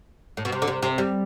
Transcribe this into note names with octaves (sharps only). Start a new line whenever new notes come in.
A2
B2
C3
D3
C3
C3
G3